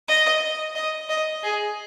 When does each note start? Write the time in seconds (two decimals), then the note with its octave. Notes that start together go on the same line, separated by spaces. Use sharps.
0.08 D#5
0.75 D#5
1.09 D#5
1.43 G#4